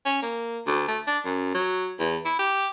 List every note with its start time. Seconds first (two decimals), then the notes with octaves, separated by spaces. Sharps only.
0.06 C#4
0.23 A#3
0.67 D2
0.88 A3
1.07 D4
1.25 F#2
1.55 F#3
2.00 E2
2.25 E4
2.39 G4